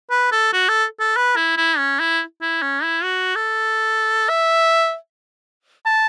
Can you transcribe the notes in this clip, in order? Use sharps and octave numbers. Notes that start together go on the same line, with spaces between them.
B4
A4
F#4
A4
A4
B4
E4
E4
C#4
E4
E4
C#4
E4
F#4
A4
E5
A5